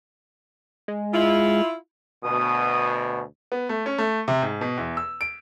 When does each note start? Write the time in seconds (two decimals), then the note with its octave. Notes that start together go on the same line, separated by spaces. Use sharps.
0.88 G#3
1.14 E4 F4
2.24 D2 B2 D#6
3.52 B3
3.69 A3
3.86 C#4
3.98 A3
4.28 C3
4.42 G#2
4.61 B2
4.77 E2
4.97 E6
5.21 D7